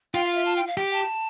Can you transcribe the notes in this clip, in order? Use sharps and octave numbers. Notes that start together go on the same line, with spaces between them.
F4 G5
F5
E5
A5
G5
F5
G4 G5
A5